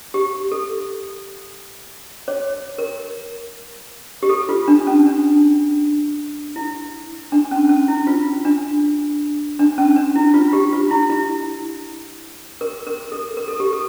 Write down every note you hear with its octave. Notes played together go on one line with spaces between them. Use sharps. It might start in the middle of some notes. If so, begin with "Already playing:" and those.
G4
A4
C#5
A#4
G4
A4
F4
D4
C#4
D4
E4
D4
C#4
C#4
E4
F4
D4
D4
C#4
D4
E4
F4
G4
F4
E4
E4
A#4
A#4
A4
A#4
A4
G4
A4